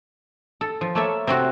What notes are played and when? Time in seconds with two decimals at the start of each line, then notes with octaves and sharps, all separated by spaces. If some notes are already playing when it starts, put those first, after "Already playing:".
0.61 A4
0.81 F3
0.95 A3 A#3 A4 C#5 E5
1.27 C3 C4 F#4